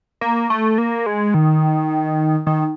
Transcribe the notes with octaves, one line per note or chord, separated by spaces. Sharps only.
A#3
A3
A#3
G#3
D#3
D#3